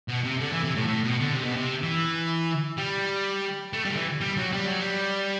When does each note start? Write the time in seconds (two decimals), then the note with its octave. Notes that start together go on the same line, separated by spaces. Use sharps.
0.09 B2
0.25 C3
0.41 D3
0.53 E3
0.64 C3
0.76 A2
0.88 A2
1.04 B2
1.20 D3
1.32 C3
1.45 B2
1.57 C3
1.83 E3
2.78 G3
3.73 A3
3.85 G3
3.91 D3
3.97 E3
4.21 G3
4.37 F#3
4.53 G3
4.66 F#3
4.80 G3